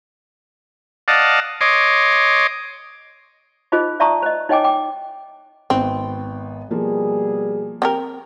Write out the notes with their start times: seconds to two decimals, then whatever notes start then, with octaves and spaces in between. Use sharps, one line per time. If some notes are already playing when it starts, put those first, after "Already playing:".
1.08 D5 D#5 F5 F#5 A5
1.61 C#5 D#5 C6 D6
3.72 D#4 F4 G#4 C5 D#5
4.00 D5 E5 A5 A#5 C#6 D#6
4.22 C5 D#5
4.49 D#4 C#5 D#5 G5 G#5 D6
4.64 G5 D6
5.70 G#1 B3 C4
6.71 B2 F3 G3 A#3 G#4
7.82 C4 G4 A#4